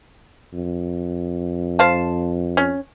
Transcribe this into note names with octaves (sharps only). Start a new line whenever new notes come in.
F2
C5 F5 A5
C#4